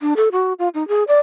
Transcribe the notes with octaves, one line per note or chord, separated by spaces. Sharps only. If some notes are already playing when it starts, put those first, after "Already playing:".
D4
A4
F#4
F4
D#4
G#4
D5